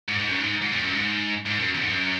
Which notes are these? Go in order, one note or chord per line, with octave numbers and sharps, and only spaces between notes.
G#2
G#2
F#2
G#2
G#2
E2
F#2
G#2
G#2
F#2
E2
G#2
F#2